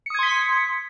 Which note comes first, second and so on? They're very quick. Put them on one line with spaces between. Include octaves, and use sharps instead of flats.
C#7 D#6 G#6 C6 B6